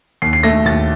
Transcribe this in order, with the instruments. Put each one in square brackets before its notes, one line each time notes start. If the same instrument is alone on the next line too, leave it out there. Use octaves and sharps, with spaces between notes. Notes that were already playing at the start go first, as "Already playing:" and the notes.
[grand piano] D#2 C7
C7
A3 A#6
D#2 A6